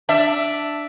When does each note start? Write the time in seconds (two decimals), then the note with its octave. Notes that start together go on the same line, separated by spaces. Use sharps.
0.09 D4 E5